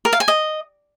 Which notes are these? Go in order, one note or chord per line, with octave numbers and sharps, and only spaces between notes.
A#4
F5
G#5
D#5